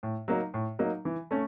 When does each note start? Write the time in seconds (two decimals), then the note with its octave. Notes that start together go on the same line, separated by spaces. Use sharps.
0.03 A2
0.28 F#3 A#3 D#4
0.54 A2
0.79 F#3 A#3 D#4
1.05 E3
1.31 A3 C#4